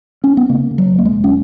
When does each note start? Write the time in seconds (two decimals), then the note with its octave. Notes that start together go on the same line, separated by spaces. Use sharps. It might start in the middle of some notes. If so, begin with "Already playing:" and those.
0.24 C#4
0.37 B3
0.49 C#3 A#3
0.71 C#3
0.78 F#3
0.91 E1
0.98 A#3
1.05 G#3
1.13 E1
1.24 C#4